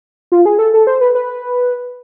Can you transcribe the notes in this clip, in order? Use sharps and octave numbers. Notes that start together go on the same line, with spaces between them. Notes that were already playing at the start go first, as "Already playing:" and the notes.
F4
G#4
A4
A4
C5
B4
B4